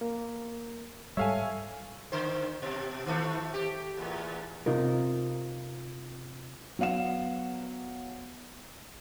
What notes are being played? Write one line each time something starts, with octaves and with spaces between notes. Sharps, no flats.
A#3
G#2 G3 A4 C#5 E5 F5 G#5
D3 C5
B2
D#3 F3 A3
G4
E2 A2
C3 D#4 F4 A#4
F#3 B3 F5 F#5 E7